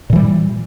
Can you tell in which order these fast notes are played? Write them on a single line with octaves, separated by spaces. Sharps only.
A#2 E3 G3